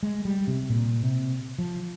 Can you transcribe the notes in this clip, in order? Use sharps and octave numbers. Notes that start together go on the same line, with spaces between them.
G#3
G3
C3
A#2
C3
F3